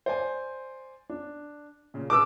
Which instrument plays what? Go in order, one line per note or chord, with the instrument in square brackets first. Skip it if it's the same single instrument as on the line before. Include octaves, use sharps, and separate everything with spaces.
[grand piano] C5 D5 G#5
D4
A#2 C#3
[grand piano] G#4 B4 [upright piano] D6 E6